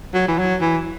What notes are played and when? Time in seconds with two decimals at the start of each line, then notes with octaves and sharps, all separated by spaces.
0.14 F#3
0.28 E3
0.39 F#3
0.61 E3